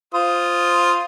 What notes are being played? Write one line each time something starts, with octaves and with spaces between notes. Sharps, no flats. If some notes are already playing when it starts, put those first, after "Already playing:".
F4 C5 D#6